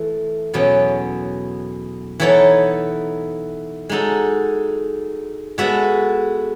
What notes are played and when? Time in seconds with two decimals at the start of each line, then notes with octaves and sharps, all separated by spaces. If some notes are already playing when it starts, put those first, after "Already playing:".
Already playing: E3 A3
0.54 E2 B2 F#3 C#4
2.20 E3 B3 D#4 A4 C#5
3.89 G#3 D#4 F#4 A4
5.58 G#3 B3 F#4 A4 E5